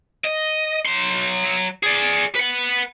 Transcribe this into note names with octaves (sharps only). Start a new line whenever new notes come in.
D#5
F#3 C6
G#4 D5
B4 F#5